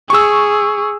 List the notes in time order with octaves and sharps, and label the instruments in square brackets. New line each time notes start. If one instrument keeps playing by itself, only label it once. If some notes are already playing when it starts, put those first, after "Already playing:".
[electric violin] G#4 [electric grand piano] C#6 E6